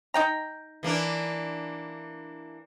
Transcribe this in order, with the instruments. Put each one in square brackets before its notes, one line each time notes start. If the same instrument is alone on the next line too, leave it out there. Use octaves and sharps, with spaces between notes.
[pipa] D#4 G5 A#5
[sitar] E3 A#3 D4